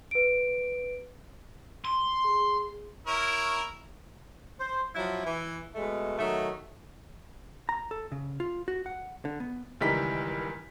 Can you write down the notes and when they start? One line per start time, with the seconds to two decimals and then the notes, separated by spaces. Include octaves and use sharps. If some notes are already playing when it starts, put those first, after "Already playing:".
0.11 B4 D7
1.85 C6
2.25 G#4
3.07 E4 A#4 C#5
4.58 C5
4.95 F3 F#3 E4
5.25 E3
5.74 B2 G#3 A3
6.18 D#3 F#3 A3
7.69 A#5
7.91 A4
8.12 C#3
8.40 F4
8.68 F#4
8.86 F#5
9.25 D3
9.40 B3
9.81 C#2 D#3 E3 G3 A#4 B6